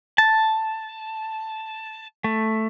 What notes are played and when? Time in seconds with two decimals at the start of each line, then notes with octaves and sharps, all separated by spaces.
0.18 A5
2.24 A3